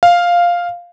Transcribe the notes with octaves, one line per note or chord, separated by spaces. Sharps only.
F5